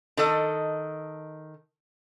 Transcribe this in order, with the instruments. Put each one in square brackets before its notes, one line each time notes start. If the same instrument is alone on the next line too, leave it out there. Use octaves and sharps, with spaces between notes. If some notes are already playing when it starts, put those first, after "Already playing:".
[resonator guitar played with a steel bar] D#3 A4 D#5